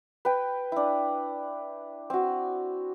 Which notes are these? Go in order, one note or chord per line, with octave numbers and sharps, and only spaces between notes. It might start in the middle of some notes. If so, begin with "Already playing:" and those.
B4 G5
D4 E4
C4 F#4